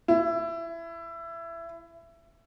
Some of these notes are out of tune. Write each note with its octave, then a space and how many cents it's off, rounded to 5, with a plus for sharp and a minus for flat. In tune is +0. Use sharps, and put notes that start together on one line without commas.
E4 +20